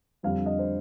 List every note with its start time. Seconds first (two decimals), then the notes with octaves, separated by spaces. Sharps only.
0.23 F2 D3 G3 D4 F5
0.46 D#5
0.59 C5